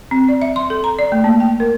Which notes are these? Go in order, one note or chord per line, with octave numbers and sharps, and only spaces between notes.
C4
D5
E5
C6
A4
A#5
D5
A3
A#3
G5
A#4